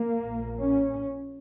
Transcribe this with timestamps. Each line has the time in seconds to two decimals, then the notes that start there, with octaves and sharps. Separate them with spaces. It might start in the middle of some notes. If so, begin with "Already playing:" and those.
Already playing: A#3
0.23 A#1 A#2
0.59 C#4